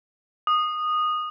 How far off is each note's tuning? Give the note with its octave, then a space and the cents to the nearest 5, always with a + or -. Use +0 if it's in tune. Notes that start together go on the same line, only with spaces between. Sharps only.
D#6 -15